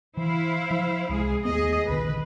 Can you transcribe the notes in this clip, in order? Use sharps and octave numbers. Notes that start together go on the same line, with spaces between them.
E3 E4 C5 F5
F3
C2 G#3 G#4
D#2 A3 B3 G#4 D#5
A#1 D3 D#3 B4